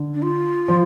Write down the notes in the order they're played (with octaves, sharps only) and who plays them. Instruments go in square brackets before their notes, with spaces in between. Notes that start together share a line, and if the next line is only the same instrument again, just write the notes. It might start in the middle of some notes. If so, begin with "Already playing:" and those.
Already playing: [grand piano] D3
[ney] D4
F4
[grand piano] F3